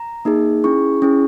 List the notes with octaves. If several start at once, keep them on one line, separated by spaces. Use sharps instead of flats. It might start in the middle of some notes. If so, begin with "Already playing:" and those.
Already playing: A#5
A#3 D#4 G#4
C#4 E4 G#4 C#6
C#4 E4 G#4